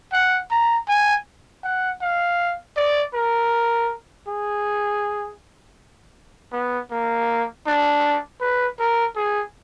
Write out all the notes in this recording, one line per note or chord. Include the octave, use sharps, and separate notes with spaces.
F#5
A#5
G#5
F#5
F5
D5
A#4
G#4
B3
A#3
D4
B4
A#4
G#4